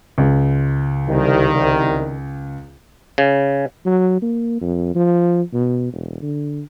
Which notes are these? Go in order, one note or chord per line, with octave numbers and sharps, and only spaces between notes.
C#2
C2 D#3
C#3
F#3
A#3
F2
F3
B2
E1
D3